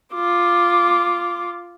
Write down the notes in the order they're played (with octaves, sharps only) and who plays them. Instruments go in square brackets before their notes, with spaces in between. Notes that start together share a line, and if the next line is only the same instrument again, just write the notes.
[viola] F4 D6